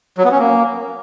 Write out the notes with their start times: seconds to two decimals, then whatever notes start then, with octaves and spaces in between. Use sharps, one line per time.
0.18 F#3
0.25 B3
0.32 C#4
0.38 A#3